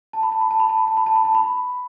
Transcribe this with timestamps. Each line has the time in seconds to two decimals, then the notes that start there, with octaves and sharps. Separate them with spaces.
0.13 A5
0.23 B5
0.32 A5
0.41 B5
0.51 A5
0.60 B5
0.69 A5
0.78 B5
0.88 A5
0.97 B5
1.06 A5
1.16 B5
1.25 A5
1.35 B5